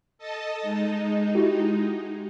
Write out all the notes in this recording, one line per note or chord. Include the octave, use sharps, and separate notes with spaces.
A4 D#5 A5
G#3 D#4
E4 F#4 G4